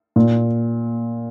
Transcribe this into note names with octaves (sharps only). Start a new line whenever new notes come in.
A#2